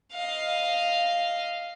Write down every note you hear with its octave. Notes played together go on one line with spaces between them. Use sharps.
D#5 F5